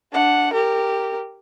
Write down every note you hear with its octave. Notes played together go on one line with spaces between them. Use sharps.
D4 F#5
G4 A#4